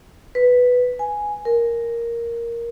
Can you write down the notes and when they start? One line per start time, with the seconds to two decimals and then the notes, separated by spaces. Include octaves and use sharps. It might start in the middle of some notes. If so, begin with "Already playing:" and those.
0.35 B4
0.99 G#5
1.45 A#4